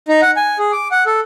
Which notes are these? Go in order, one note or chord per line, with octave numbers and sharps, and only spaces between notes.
D#4
F#5
G#5
G#4
D6
F#5
A4